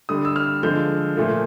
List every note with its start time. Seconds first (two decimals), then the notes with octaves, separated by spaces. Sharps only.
0.09 D3 G3 D#6
0.25 E6
0.36 F6
0.63 D3 F3 G#3 G6
1.17 A#2 F3 A3